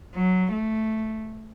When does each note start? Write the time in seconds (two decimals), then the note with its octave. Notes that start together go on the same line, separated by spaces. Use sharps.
0.15 F#3
0.52 A3